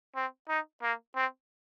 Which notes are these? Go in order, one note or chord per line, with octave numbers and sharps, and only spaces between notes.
C4
D#4
A#3
C4